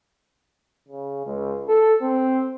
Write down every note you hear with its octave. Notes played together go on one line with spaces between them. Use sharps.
C#3
C#2
A4
C4